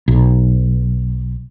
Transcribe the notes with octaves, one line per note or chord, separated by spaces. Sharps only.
B1